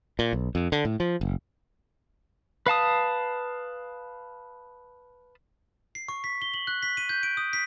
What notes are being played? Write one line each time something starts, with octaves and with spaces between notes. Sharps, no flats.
A#2
B1
F2
D3
A2
F3
F#1
B4 F5 A5 D#6
C7
C#6
B6
G7
F#7
F#6
B6
D#7
G6
D7
D#6
B6